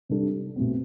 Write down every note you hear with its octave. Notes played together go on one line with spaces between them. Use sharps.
C3 G3 D4 A4
B2 A3 C4